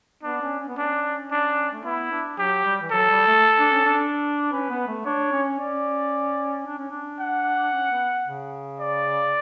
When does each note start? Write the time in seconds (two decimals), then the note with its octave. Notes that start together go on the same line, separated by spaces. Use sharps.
0.23 B3 D4
0.42 C#4
0.59 C#4
0.68 B3
0.77 C#4 D4
1.31 D4
1.72 A3
1.84 B3 E4
2.11 D4
2.38 F#3 G4
2.65 G3
2.82 E3
2.91 F#3 A4
3.09 G3
3.27 A3
3.58 D4
3.71 C#4
3.85 D4
4.52 C#4 B4
4.70 B3
4.88 A3
5.05 D4 C#5
5.32 C#4
5.59 C#4 D5
6.66 D4
6.78 C#4
6.91 D4
7.20 F#5
7.73 C#4
7.91 B3
8.27 C#3
8.80 D5